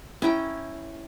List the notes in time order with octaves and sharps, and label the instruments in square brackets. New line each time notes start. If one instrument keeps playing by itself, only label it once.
[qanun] C#4 E4 G5 A#5